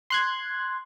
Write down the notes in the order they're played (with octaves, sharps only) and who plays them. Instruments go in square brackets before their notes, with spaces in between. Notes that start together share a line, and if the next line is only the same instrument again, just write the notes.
[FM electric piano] C6 F#6 G#6